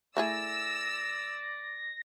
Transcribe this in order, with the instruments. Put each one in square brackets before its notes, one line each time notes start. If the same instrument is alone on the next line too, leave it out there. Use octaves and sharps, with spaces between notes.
[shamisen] A3 E4 G#4 [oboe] D5 [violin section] E6 [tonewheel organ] A#6